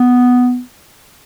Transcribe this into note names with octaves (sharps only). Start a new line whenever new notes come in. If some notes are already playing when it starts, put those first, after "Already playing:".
Already playing: B3